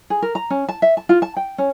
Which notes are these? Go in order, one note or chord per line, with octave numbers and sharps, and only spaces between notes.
G#4
A#4
A#5
C#4
A5
E5
A5
F4
A5
G5
C#4